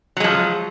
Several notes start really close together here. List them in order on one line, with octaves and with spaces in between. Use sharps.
F#3 G#3 F3